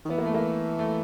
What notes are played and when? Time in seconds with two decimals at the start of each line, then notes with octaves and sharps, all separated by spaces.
0.05 D#3
0.10 E3 B3
0.18 A#3
0.26 A3
0.34 A#3
0.79 A3